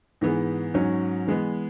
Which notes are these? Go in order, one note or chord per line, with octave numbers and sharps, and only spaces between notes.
G#2 E3 B3 G#4
G#2 F#3 C#4
E3 G#3 B3